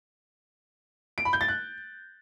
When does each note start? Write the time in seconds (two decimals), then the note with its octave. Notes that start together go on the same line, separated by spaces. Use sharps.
1.18 D7
1.25 B5
1.33 G6
1.41 A6
1.48 F#6